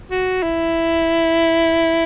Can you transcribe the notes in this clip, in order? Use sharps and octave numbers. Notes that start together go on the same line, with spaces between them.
F#4
E4